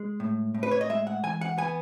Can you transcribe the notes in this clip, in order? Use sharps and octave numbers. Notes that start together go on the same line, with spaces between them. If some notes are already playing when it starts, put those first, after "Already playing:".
Already playing: G#3
A2
A2
B4
C#5
D#5
G#3 E5
F#5
E3 G#5
F#5
B3 G#5